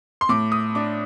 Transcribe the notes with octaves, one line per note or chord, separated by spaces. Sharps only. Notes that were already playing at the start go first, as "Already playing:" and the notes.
C6
A2 D6
D#6
D4 D6